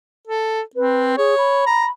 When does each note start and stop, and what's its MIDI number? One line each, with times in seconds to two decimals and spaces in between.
0.27 0.61 69
0.76 1.17 60
0.76 1.16 71
1.18 1.35 68
1.18 1.64 73
1.38 1.90 83
1.67 1.85 82